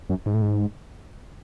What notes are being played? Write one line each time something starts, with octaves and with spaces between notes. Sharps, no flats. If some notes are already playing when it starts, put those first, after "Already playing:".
F#2
G#2
A2
G#2